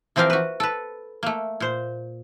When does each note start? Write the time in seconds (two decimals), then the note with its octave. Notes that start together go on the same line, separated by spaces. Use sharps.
0.16 E3 F3 C4 G4 A#4 F5
0.30 F#4 B4
0.60 A4 B4
1.23 A3 A#3
1.60 A#2 C5